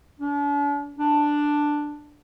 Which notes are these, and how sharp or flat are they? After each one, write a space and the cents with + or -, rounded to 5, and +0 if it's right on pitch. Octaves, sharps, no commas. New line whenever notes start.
D4 -40
D4 +5